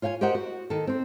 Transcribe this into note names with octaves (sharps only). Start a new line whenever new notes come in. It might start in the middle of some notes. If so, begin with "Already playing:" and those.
F4 C#5 F5 G5 G#5
G4 A#4 C5 D#5 F#5
F#4
D#3 A4
C4 C5